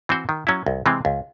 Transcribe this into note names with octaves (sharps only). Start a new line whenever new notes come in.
E3 C4 F#4 C5
D#3
F#3 C#4 E4
C2
C3 E3 G#3 C4
C#2